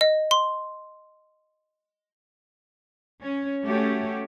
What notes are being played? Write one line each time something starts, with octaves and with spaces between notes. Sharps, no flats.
D#5
C6
C#4
A3 C#4 F#4 G4